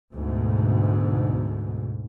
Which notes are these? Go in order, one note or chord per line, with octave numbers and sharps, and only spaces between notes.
D2 G#2 B2